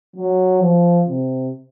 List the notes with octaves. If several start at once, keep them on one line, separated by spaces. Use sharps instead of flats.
F#3
F3
C3